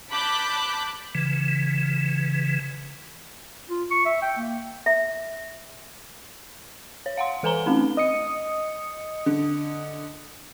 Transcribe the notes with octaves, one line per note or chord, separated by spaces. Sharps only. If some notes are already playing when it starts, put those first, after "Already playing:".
A5 B5 D6 F#6 G6 B6
C#3 E3
F4
C#6
E5
G5
A#3
E5
C#5
F5 F#5 C6
E3 A4 B4 G#5 A#5 G7
A3 C4 C#4 D#4
D#5 D#6 C#7
D3